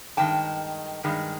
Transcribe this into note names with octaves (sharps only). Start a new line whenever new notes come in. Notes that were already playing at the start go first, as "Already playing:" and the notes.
G2 D#3 G#3 G5 A5
G2 D#3 G#3